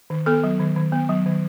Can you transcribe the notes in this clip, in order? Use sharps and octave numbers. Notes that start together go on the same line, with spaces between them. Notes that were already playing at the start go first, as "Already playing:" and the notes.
D#3
B3 A4
F#3
D#3
D#3
B3
F#3
D#3